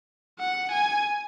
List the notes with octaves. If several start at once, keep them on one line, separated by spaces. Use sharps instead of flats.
F#5
G#5